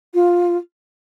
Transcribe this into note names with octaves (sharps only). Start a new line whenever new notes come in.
F4